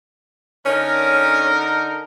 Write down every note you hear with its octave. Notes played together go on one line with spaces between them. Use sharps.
D3 C#4 D#4 A#4